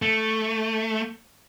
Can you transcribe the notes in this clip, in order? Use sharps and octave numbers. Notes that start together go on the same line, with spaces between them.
A3